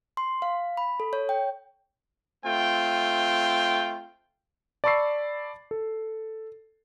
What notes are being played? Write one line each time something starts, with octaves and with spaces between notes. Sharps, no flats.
C6
F5
B5
A4
C#5
G5
A3 C4 F4 G5
D5 A5 B5 C#6 E6 C7
A4